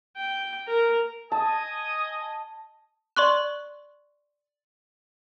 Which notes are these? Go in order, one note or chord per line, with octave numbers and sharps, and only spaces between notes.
G5
A#4
D#5 G#5 A5 D#6
D5 C6 C#6 F#6